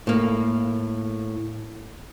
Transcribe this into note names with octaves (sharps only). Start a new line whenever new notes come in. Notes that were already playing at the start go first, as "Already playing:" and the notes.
A2 A#3